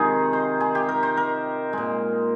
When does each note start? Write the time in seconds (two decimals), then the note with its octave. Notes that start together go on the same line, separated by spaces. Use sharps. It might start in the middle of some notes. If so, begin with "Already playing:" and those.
Already playing: C3 D#3 G#3 D#4 F4 G#4
0.33 C5
0.61 G#4
0.75 G4
0.89 A#4
1.03 C5
1.17 A#4
1.73 A#2 G#3